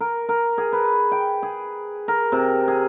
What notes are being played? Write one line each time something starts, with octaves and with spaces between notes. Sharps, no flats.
A#4
A#4
G#4
B4
G5
G#4
A#4
C3
G#4